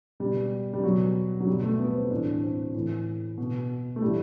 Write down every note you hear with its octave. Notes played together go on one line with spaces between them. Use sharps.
B2 G3
G3
B2 F#3
F#3
B2 G3
A3
B3
C4
A2 E3 D4
C4
A2 E3
B2
A3
A2 E3 G3